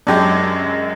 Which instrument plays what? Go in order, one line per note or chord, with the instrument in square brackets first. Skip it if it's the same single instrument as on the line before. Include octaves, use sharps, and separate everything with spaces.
[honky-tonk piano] F#2 F#3 G#3 [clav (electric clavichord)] D4 G4